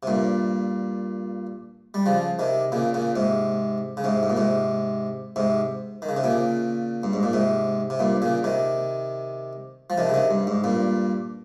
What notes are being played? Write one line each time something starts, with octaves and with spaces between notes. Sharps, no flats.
C3
G2 A#2
G3
C#3 F3
C3 D#3
A#2 C#3
A#2 C#3
G#2 C3
C#3
G#2 C3
G#2
A#2
G#2 C3
G#2 C3
D#3
C#3
C3
A#2 C#3
G2
G#2
A#2
G#2 C3
C3
G2 A#2
A#2 C#3
C3 D#3
F3
C3 D#3
C#3
C3 D#3
G2
G#2
G2 A#2